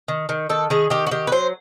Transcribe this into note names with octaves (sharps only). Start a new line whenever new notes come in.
D#3
D#3
D#3 A4
D#3 G#4
D#3 G4
F#4
D#3 G4
B4
F#3 C5